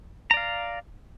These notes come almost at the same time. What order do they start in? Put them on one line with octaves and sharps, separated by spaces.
A#5 D5 F5